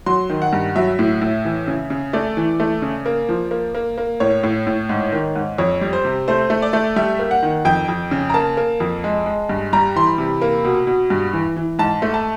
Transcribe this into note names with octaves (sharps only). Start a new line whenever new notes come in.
F#3 C6
D#3
F#5
G2
F#3 E5
A2
A2
E3
C#3
C#3
A3 D5
E3
A3
C#3
A#3
F3
A#3
A#3
A#3
A2 C#5
A2
A2
G#2
D#3
G#2
F2 C#5
G3
C5
C3
A3 C5
A3
D5
A3
G3 E5
A#3
F#5
D#3
F2 G5
F2
C#3
A#5
A#3 A5
A#3
F2
G#3
G#3
G2
G3 A#5
E3 C6
B5
C3
A#3
B2
B2
G2
E3
E3
G#2 A5
A3
A5